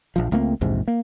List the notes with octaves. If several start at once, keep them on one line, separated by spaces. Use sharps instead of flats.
A#1 F3
C#2 A3 A#3 C4
A#1 E2 G#2 C3
A#3